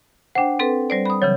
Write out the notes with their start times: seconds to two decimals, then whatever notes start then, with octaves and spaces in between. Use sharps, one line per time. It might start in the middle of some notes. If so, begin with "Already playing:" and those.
0.35 D4 C5 F#5 G5
0.59 C4 A4 B4
0.90 G3 C5 D5
1.05 B5 D#6
1.22 C#3 E3 F#3 C#5